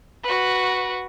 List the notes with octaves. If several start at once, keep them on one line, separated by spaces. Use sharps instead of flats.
F#4 B4